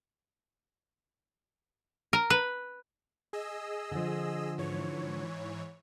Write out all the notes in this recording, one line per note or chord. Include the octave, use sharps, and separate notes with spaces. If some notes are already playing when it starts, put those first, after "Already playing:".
A#4
B4
G#4 D#5 E6
D3 F3
G#2 E3 C#5